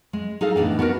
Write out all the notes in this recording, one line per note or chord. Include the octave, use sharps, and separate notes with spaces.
G#3
D#4 G#4 A4 F5
A2 E3 B3 D4 D#4
B3 D4 D#4 F#4 G4 A#4